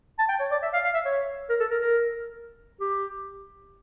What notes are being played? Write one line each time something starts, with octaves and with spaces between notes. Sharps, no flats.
A5
G5
C#5
D5
E5
F5
F5
E5
C#5
A#4
A4
A#4
A#4
G4